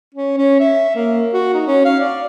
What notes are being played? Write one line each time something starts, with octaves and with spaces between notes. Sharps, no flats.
C#4
C#4
E5
A#3
F#4
D#4
C#4
F5
D5